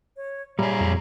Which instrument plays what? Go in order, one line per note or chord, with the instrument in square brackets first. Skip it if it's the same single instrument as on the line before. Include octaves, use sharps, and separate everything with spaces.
[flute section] C#5
[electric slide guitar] A#2 G#4 [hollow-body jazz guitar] G3 [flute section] C#5 E5 A#5
[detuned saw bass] F2